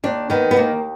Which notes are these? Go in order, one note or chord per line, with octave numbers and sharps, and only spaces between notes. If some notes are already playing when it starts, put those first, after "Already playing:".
D#2 D4
D#3 B3
B3
D#2 A#3